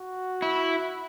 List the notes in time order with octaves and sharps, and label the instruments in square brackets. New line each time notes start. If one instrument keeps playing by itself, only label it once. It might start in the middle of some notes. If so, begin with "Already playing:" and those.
Already playing: [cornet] F#4
[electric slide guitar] E4